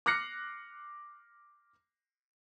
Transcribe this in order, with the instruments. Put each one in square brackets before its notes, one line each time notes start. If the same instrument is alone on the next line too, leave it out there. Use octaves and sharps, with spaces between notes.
[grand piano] D6 F6 F#6 A#6 C7 C#7